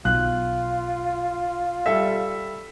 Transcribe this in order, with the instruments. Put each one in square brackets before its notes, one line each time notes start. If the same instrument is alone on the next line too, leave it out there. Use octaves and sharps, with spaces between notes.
[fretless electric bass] B1 [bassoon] F4 [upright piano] F#6
[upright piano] G3 A4 E5